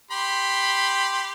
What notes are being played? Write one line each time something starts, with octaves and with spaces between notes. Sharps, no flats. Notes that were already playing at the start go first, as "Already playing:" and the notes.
G4 B5 C6